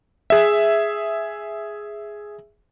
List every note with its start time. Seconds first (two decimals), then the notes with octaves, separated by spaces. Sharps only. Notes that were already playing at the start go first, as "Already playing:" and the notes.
0.30 G#4 E5